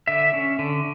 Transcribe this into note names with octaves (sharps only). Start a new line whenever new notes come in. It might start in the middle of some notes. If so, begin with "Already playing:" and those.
D3 E5
C#4
D3